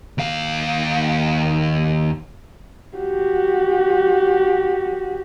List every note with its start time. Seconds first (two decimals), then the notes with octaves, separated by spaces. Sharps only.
0.18 D#2 F5
2.97 F#4 G4